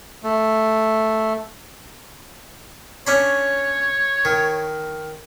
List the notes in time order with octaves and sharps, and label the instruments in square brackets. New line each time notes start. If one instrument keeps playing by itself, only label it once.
[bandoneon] A3
[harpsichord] C#4 D4 B5 [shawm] C#5
[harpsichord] D#3